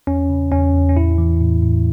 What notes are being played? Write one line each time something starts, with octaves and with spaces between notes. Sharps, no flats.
E2 C#4
C#3
E2 C#4
E2
C#4
A2 E4
E3
A2
A2